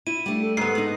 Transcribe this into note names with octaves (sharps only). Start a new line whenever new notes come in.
E4 D#7
G3 A3 D4
A4
G#2 B3 A4 C7
G#3 D#4